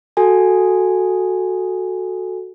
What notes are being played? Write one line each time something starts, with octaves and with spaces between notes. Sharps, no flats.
F#4 A4 G#5